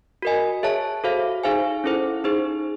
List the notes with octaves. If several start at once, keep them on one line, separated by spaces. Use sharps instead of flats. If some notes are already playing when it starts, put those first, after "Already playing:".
F#4 A#4 D#5 G#5
G#4 C#5 E5 A5
F#4 A4 C5 F5
D#4 G#4 C5 F5 G#5
C#4 E4 A4 C5
D#4 G#4 C5